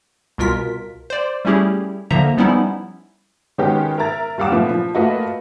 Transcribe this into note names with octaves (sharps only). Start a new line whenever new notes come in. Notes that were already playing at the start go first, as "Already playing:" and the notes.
C2 B2 F4 A#4 B6
C5 D5
G3 A3 C#4 E4 G4 G#4
D3 F3 A#3 E5 A#5
F3 G3 B3 C#4 D#4 E4
D#3 G#3 B3 C#4 F#4 G4
A#4 E5 A#5 A6
D#2 G3 F5 F#5 D6 E7
A#2 F3 A3 B3
F3
A3 A#3 F4 F#4 B4 D#5